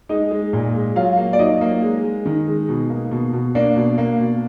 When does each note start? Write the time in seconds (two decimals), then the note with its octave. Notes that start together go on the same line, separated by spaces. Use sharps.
0.09 G#3 D#4 D#5
0.31 G#3
0.53 A#2
0.74 G#3
0.96 F#3 F4 F5
1.17 A#3
1.33 D5
1.39 F#3 D#4 D#5
1.61 A#3
1.82 G#3
2.04 G#3
2.26 D#3
2.47 G#3
2.69 B2
2.90 A#3
3.11 B2
3.33 B2
3.55 A#3 D4 D5
3.76 B2
3.98 A#3
4.20 B2